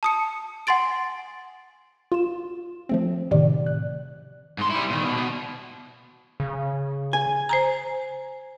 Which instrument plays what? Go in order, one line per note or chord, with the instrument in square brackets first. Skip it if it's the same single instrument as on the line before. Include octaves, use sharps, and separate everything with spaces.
[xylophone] A5 D#6 C#7
F#5 G#5 C6 A6 D7
[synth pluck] F4 E7
F3 A3 C4
A2 C3 D#3 D5
F#6
[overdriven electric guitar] G#2 C6
G3 E4
A#2 D#3
B2
B2
[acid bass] C#3
[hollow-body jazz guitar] G#5
[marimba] C5 G#5 A#5